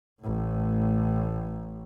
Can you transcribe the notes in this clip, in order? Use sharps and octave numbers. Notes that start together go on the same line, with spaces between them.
A1 A2